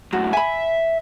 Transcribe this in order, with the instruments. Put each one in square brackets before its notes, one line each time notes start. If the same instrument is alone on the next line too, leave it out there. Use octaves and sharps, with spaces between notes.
[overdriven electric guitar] F#2 A2 [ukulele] F#4
[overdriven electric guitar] E5 [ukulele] G#5 B5